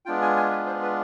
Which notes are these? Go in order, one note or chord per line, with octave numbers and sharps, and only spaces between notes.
G#3 B3 D4 F4 G5
G#5
G#5
B4
C5
B4